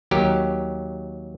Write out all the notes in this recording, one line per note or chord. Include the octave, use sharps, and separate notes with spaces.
D#2 F#3 G4 A#4